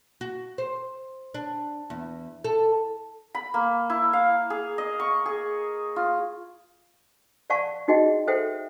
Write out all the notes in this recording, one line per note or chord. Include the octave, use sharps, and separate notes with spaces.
F#4
C5
D4
E2
A4
B5
A#3
E4
F5
G#4
D#5
C#6
G#4
F4
D5 F5 F#5 A5 C#6
D#4 F#4 G#4 D#5 G5
A4 C5 E5 F#5 G5